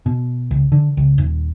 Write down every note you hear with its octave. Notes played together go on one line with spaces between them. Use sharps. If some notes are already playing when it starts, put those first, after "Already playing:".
B2
C#2
D3
C#2
D#1